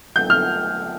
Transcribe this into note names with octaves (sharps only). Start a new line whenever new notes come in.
G6
F6